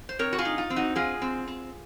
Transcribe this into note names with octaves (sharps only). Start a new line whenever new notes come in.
C5
C4 A#4 C#5
F#4
F4 G#4
D#4
F4
C4
D#4 F#4
G#3 F4 G#4
C4
C4